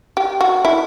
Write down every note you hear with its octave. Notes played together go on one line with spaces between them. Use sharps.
G4
F#4
E4